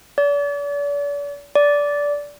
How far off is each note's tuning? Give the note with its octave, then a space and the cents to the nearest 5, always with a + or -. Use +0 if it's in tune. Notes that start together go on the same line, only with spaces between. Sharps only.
D5 -40
D5 -15